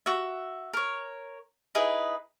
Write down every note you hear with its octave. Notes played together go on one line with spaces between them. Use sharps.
F#4 E5
A#4 C#5
D#4 E4 G#4 B4